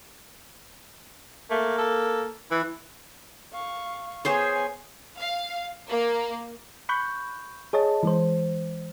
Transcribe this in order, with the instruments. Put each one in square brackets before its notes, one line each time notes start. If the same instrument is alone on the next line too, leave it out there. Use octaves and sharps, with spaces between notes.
[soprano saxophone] A3 [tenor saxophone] A#3
[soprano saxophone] A4
[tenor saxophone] E3 [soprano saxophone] E4
[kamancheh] F5 C#6
[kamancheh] B3 G#5 [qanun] G#4 C5 C#5
[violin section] F5
A#3
[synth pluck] B5 C#6 F#6 G6
G#4 C#5 D#5 A5
E3 G#3 C5